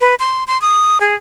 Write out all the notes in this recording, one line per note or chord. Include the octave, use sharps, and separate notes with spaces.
B4
C6
C6
D#6
G#4